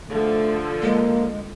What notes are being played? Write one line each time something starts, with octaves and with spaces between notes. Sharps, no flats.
D3 F3 A3 A4
G#3 A#3